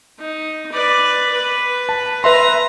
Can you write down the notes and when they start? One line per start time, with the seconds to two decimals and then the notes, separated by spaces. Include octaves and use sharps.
0.19 D#4
0.72 B4 D5
1.34 B4
1.89 A5
2.24 B4 E5 A#5 C6